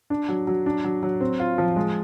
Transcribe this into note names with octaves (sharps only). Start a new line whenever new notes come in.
D4
F#3
F#3
D4
F#3
F#3
C4
F4
F3
G#3